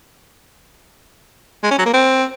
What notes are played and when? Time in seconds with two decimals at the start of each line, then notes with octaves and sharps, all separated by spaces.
1.63 G#3
1.71 C#4
1.78 F#3
1.86 A#3
1.93 C4